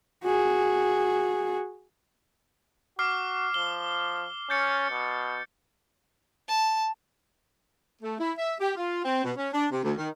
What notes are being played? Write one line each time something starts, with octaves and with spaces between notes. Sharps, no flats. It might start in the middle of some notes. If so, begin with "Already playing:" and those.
F#4 G#4
F#4 D6 F6 C7
F3 G7
C#4 G6 A6 C#7
B2
A5
A3
E4
E5
G4
F4
C4
B2
C#4
D4
C3
D2
D#3